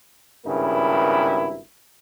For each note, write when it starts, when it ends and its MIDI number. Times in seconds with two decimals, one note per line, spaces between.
0.46 1.60 32
0.46 1.60 43
0.46 1.60 49
0.46 1.60 59
0.46 1.60 64
0.46 1.60 70